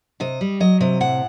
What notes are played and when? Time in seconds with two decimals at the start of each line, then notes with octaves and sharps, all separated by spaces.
0.20 C3 D#5
0.41 G3
0.60 F#3 D#5
0.80 C3 D#5
1.00 A2 F#5